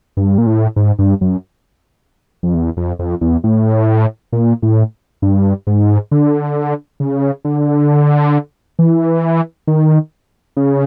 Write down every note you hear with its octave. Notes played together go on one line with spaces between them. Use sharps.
G2
A#2
A2
G#2
G2
F#2
F2
E2
F2
F2
E2
A2
A#2
A2
G2
G#2
D3
C#3
D3
E3
D#3
C#3